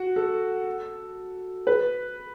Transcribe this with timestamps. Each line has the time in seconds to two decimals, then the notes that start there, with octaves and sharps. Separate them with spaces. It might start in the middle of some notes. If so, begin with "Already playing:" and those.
Already playing: F#4
0.16 A4
1.67 B4